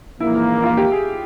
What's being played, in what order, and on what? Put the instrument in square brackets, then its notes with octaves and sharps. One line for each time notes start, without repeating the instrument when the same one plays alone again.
[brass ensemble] A#1 G#2 E3 A#3 [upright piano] E4
[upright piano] F4
G4
G#4